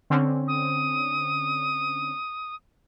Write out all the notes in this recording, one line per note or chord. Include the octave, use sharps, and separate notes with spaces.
D3 C4 C#4
D#6